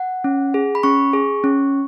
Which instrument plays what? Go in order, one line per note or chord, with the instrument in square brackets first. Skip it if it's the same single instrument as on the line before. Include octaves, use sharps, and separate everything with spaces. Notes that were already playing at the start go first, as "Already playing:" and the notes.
Already playing: [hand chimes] F#5
C#4
G#4
B5
C#4 C#6
G#4
C#4